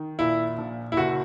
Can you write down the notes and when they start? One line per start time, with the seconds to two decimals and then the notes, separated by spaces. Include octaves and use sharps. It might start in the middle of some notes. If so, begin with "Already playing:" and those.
Already playing: D#3
0.19 A#2 E4
0.58 A#1
0.92 E4
0.97 F#1 F#4